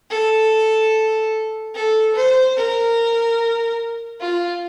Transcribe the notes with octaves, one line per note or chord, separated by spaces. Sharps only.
A4
A4
C5
A#4
F4